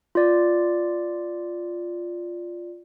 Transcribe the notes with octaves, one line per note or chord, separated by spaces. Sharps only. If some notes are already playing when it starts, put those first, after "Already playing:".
F4 D5